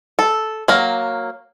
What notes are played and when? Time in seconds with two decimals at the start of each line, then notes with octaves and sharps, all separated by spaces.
0.19 A4
0.68 F#3 A#3